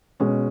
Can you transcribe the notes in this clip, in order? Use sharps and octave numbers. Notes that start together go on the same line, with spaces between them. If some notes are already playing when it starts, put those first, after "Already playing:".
B2 G#3 C#4